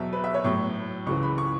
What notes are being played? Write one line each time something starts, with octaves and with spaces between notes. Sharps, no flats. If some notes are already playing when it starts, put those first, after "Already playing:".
Already playing: E2 B2 F#3 E5
B4
E5
C#5
A2 F#3 C#6
C#2 C#3 E3 C#6
B5
C#6